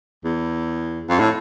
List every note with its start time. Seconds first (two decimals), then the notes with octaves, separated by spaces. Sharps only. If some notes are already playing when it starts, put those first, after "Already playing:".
0.24 E2
1.09 F2
1.19 A2